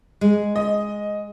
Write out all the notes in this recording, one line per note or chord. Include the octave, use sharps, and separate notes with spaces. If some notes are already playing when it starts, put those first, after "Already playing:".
G#3
D#5